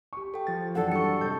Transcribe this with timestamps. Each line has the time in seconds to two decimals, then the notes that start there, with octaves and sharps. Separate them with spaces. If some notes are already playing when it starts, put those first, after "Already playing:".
0.13 G4 C#6
0.34 A4 G5
0.47 F3 A6
0.75 F#2 E3 D4 A4 F#5
0.92 G3 A4 C#6 C#7
1.21 C3 D#5 A5 G6